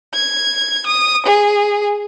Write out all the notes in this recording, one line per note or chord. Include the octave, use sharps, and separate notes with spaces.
G#6
D#6
G#4